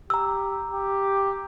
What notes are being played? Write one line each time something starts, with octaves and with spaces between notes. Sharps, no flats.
G4 A#5 E6
G4